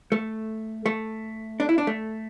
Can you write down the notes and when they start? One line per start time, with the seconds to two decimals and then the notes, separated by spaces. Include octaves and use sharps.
0.12 A3
0.86 A3
1.60 D4
1.69 E4
1.78 D4
1.87 A3